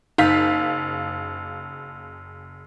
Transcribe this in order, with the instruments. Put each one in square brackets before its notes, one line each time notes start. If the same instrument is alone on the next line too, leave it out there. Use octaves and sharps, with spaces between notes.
[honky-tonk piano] F#1 F5 B6 [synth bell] D#4